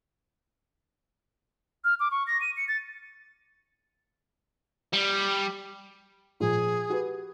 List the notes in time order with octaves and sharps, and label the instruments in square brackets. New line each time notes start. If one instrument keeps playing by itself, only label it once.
[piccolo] F6
D6
C#6
A#6
D#7
C#7
A6
[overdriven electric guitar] G3
[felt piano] A#2 F3 [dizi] G#4
[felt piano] F#4 G4 B4